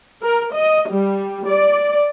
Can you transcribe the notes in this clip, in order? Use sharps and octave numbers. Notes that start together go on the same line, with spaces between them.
A#4
D#5
G3
D5